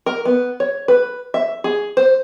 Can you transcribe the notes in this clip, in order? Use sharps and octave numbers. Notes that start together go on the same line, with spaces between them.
A#4
B3
C#5
B4
E5
G#4
C5